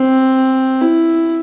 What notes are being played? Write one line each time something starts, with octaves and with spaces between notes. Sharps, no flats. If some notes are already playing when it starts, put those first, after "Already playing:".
Already playing: C4
E4